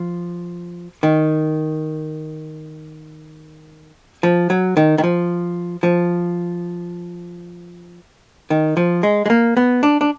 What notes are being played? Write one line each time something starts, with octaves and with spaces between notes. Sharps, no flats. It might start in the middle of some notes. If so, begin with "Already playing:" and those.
Already playing: F3
D#3
F3
F#3
D#3
D#3
F3
F3
D#3
F3
G#3
G#3
A#3
B3
D4
D4